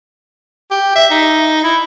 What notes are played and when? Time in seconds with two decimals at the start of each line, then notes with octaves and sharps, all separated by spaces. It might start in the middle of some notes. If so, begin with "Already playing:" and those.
0.71 G4
0.96 E5
1.11 D#4
1.64 E4